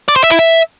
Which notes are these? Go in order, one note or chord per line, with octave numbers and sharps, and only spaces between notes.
D5
C5
E5
E4
E5